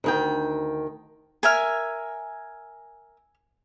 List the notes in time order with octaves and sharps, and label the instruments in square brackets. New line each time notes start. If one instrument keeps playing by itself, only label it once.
[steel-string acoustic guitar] D2 D#3 G5
[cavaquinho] A#4 E5 [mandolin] G#5 F6